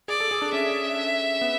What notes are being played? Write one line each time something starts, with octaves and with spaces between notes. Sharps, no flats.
G#4 D5
A4
G#4
D4
C#4 E5
B3